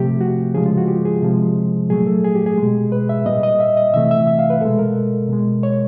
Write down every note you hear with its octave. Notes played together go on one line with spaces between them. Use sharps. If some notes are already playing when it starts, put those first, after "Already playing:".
Already playing: C3 F3 A3 G4
F#4
C#3 F3 G#3 G#4
F4
F#4
G4
G#4
C3 F3 G#3
A#2 F#3 A3 G#4
A4
G#4
G4
G#4
B2 G#3
B4
E5
A#2 G3 D#5
D#5
E5
D#5
C3 E3 A3 E5
E5
E5
F5
B4
B2 G#3 A4
A#4
B2 G#3
C#5